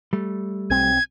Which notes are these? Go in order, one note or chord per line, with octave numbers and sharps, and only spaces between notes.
G3 A3
B1 C4 G#6